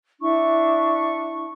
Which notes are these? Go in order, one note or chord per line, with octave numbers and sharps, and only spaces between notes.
D4 E4 C#6